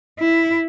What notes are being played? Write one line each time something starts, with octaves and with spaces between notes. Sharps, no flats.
E4